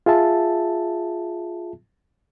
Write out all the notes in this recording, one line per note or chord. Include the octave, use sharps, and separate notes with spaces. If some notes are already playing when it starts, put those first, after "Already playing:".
F4 G#4 E5 A5